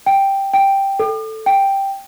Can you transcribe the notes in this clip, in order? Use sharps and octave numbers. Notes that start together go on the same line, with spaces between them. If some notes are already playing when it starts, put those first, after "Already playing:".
G5
G5
A4
G5